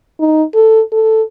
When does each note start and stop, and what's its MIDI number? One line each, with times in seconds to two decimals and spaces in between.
0.20 0.43 63
0.54 0.82 69
0.92 1.22 69